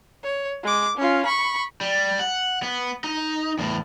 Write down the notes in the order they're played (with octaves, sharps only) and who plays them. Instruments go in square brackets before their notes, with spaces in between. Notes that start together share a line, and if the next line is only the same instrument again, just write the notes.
[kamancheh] C#5
G#3 D6
C#4 F4
B5 C#6
[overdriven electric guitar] G3
F#5
B3
D#4
E2 A2